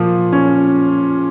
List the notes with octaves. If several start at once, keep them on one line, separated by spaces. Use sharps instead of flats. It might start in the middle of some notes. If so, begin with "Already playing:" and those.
Already playing: A#2 F3
C#4